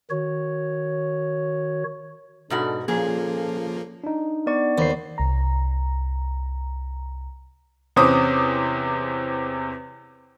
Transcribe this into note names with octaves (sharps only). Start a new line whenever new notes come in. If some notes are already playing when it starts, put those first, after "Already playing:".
D#3 F#4 C#5
G#2 B2 G#3 D4 F#4 A4
A#2 F3 A#3 C#4 F4 G#4 A4
D4 D#4
B3 D5 C#6
D#2 C5 B5 C7
C2 A#5
E2 C3 C#4 C5 D6 D#6